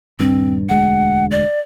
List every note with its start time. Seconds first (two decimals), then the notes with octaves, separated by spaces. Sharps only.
0.19 D#1 G2 C4
0.69 E1 D2 G#3 F#5
1.31 D5